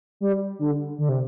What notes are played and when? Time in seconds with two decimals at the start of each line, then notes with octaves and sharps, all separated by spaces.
0.21 G3
0.59 D3
0.98 D3
1.09 C3